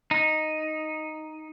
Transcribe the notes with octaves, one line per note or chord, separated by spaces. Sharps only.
D#4